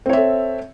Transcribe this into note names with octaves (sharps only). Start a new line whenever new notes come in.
C4 A4 C#5 E5